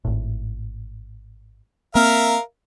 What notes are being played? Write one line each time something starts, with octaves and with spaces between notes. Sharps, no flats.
G#1 A2
A#3 C4 A#4 E5 F5